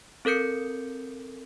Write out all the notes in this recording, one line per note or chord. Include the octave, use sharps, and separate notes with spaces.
C4 A4 A#4 G6 C#7